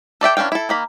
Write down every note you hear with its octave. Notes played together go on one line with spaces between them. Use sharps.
A4 D5 E5 G5
E3 C#4 D4 F5 G5
E4 A4
D#3 A#3 B5